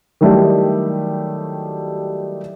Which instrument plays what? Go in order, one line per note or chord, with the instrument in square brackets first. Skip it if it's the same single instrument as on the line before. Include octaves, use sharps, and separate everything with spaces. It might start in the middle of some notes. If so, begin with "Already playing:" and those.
[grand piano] D#3 F#3 G3 A3 E4 G4